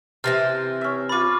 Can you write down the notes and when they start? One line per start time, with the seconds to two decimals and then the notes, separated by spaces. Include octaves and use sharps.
0.24 C3 E3 C4 G5 A5 C6 F6 A#6
0.81 C#4 E5
1.09 F4 A5 B5 D6